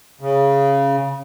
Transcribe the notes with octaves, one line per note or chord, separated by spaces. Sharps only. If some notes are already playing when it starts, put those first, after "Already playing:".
C#3